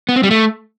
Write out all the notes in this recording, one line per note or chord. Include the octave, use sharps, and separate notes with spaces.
B3
C4
G3
A3